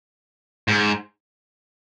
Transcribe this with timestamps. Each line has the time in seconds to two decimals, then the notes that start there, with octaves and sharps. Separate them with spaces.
0.68 G#2